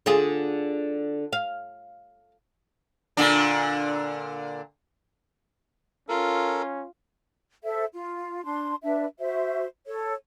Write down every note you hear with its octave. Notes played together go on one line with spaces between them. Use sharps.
D3 F4 G#4
F5
A#2 D3 D4
C#4 F4 A4 A#4
A4 C5 E5
F4
D4 C6
D4 B4 E5
F#4 C5 E5
A4 C#5